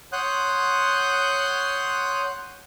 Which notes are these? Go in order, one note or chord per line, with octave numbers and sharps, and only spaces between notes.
C#5 F#5 C6 D#6 F#6 G6